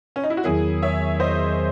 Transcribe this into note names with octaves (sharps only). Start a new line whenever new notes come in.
C#4
D#4
E4
F#4
E2 D#3 F#3 E4 G#4
C#5 E5
C5 D#5